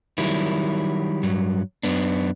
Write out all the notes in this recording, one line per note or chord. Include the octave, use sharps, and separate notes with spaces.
D#3 F#3 G3 E4
G2 F#3
F#2 B3 D4